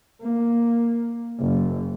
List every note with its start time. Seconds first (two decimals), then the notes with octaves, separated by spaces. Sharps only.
0.22 A#3
1.40 F#1